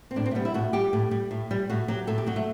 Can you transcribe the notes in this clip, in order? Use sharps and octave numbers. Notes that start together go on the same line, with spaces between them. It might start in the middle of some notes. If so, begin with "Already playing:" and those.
C4
A2 D4
C4
A3
G3 B3
E4
A2 F#4
G3 G4
A2
G3
A2
G3
A2 F#4
F#3 G4
A2 A4
G4
F#3 F#4
A3